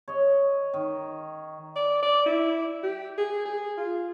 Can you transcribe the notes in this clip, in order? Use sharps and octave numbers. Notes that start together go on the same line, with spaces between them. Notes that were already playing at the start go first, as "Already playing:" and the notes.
C#5 D#5
D#3
D5
D5
E4
G4
G#4
G#4
F4